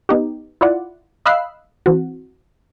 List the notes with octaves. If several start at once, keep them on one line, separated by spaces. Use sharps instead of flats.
B3 D#4 G4
E4 F4 D5 F#5
D#5 F5 B5 E6 F#6 C7
E3 C4 F#4